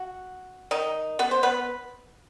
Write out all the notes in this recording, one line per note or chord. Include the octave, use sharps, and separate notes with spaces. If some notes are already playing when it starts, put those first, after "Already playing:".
Already playing: F#4
D#3 D#4
B3 B4
C5
B3 B4